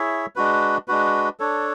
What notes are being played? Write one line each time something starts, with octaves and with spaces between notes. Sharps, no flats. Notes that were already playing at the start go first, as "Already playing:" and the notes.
Already playing: E4 G#4 C#5 E5
G#3 D4 F#4 B4
G#3 D4 F#4 B4
D4 A4 C#5